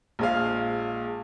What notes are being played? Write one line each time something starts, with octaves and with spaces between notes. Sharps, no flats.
A#1 G#3 F5